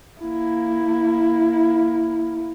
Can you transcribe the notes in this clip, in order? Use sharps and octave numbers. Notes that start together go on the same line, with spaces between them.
A#3 E4